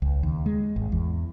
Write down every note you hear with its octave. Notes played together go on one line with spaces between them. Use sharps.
C#2
D#2
G#3
G#1
E2